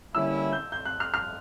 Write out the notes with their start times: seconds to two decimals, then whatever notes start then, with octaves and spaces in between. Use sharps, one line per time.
0.15 D3 G3 A#3 C#4 E4 E6
0.53 G6
0.72 G6
0.85 F#6
1.00 F6
1.14 F6